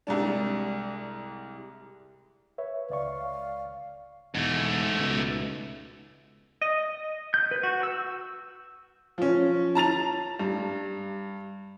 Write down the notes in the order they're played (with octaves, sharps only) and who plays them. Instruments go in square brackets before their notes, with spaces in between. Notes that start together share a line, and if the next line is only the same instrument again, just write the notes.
[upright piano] C2 G#2 D4
[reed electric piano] B4 C#5 E5
[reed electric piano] C#2 D5 C#6 [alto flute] F5
[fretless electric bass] E1 [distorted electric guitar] G#2 A3
[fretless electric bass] C#2 B2
[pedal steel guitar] D#5
G6
B4
F#4
E6
[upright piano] F3 C#4
A5 A#5 A6 F7
G2